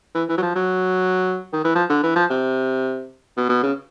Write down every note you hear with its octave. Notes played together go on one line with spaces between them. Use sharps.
E3
E3
F#3
F3
F#3
D#3
E3
F3
D3
E3
F3
C3
B2
B2
C#3